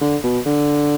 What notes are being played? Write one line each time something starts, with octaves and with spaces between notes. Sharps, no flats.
D3
B2
D3